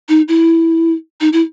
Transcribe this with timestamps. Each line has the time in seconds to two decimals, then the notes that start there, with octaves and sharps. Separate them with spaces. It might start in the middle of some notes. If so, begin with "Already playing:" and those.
0.09 D#4
0.28 E4
1.21 D#4
1.33 E4